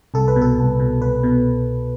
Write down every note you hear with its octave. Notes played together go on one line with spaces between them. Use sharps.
C2 A4
B4
B2
A4
C2
B2
C2 B4
B2